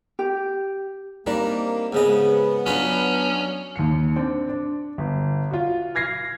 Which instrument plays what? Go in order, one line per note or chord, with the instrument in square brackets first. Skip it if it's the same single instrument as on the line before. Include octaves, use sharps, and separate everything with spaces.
[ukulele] G4
[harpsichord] G3 D4 [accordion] A#3 [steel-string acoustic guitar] C4 D#4 A#4
[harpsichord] G#2 C#3 D#5 [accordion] B3
[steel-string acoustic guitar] F#3 D4 [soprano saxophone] C#4 [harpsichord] F4 B4
[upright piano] D#2 C#7
C4 D4
D4
G1
F4 F#4
F6 G#6 A#6 C7